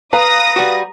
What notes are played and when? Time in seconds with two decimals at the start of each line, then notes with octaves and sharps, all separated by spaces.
0.13 B4 F5 A#5 D#6 A#6
0.56 G3 F#4